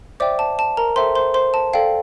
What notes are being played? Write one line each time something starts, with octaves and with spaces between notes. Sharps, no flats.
C5 D5 E5 G5 D6
A5
A5
A#4 A#5
A4 C5 E5 G5 C6
C5 C6
C5 C6
A5
A4 D5 F5 G5